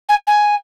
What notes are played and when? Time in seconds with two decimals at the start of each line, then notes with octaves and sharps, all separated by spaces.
0.09 G#5
0.27 G#5